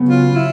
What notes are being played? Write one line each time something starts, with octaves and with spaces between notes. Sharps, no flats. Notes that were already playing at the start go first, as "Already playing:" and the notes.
Already playing: C#3 F#3 B3
F4
E4